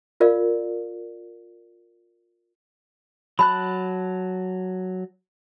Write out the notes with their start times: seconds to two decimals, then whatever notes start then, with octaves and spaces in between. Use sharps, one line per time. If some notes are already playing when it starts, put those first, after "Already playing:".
0.20 F4 A#4 D5 F5
3.39 F#3 A5 B5 F#6